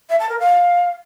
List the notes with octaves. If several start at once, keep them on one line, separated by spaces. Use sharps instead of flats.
E5
A5
A#4
F5